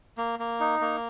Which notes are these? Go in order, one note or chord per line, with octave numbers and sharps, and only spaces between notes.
A#3
A#3
D#4
A#3